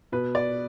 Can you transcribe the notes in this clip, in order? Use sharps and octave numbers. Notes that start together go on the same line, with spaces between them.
B2 B4
D5